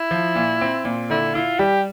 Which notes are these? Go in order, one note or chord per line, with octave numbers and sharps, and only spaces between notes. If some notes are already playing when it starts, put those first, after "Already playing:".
Already playing: E4
F3
A#2
C4
A#2
D3 E4
E4 F4
G3 G4